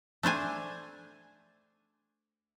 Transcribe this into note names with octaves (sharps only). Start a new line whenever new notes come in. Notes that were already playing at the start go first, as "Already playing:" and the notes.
A3 D4 C5 G#5